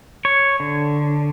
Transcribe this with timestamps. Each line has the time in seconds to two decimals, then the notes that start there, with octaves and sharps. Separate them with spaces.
0.25 C#5
0.60 D3